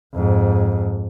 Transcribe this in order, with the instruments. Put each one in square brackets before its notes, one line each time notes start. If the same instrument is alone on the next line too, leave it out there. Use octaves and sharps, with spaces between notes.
[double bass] F2 G#2